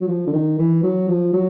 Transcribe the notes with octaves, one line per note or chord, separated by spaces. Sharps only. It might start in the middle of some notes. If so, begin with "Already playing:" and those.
F#3
F3
D3
D#3
E3
F#3
F3
F#3